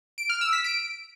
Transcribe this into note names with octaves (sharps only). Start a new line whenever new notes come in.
D7
F6
E6
B6
D7